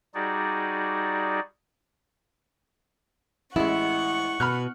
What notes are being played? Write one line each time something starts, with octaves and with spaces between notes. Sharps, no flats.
G3 D#4 F#4 G#4 D5
A1 G#3 E4 F#5 C#6
B2 B5 F6 F#6